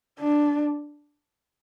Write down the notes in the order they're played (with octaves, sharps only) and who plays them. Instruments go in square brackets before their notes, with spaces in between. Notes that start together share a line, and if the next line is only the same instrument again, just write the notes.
[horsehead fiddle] D4